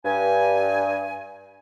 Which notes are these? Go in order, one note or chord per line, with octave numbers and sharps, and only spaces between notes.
G2 G#5